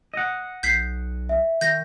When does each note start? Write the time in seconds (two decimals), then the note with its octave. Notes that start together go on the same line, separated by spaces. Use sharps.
0.14 D#5 F#5
0.63 B1 G6 B6 C7
1.29 E5
1.61 D#3 G6 A#6